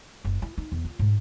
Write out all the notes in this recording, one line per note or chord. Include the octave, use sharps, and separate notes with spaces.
F#1
E4
D#4
E2
F4
G#2